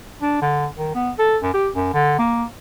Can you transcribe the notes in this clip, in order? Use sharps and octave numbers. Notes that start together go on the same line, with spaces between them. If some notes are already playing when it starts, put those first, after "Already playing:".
D4
D3
D#3
B3
A4
F#2
G4
F#2
D3
A#3